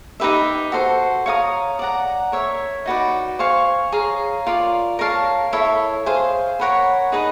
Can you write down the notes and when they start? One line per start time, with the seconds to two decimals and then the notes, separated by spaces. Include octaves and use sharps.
0.20 D#4 G4 B4 E5
0.72 F#4 A4 C5
1.26 C#5 F5 A#5 D#6
1.79 D5 F#5 A#5
2.32 A#4 C#5 E5
2.86 D#4 F#4 B4 D5
3.39 C5 F5 G#5 C#6
3.92 G#4 C#5 F5 A#5
4.47 F4 A#4 D5
4.99 A#4 C#5 F5 A5
5.53 E4 A4 C#5 E5
6.06 G#4 C5 F5
6.60 A#4 C#5 F#5 B5
7.12 D#4 G#4 B4 D#5